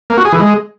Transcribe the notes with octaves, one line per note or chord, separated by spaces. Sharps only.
A#3
F#4
G#4
E3
G#3